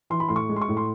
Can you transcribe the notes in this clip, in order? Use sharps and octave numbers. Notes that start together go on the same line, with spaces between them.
E3 C6
B5
A2 C6
C#6
G#3
C6
C#6
A2
C6